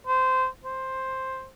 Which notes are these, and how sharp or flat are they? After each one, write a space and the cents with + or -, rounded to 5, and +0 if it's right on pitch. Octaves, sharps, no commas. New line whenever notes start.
C5 -15
C5 +5